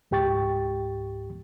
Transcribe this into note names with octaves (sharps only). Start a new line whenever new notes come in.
C#2 G#2 G4 G5 C#6 A6